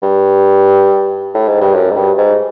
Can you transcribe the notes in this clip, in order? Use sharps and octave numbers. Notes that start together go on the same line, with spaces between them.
G2
A2
G#2
G2
F#2
G#2
G2
G#2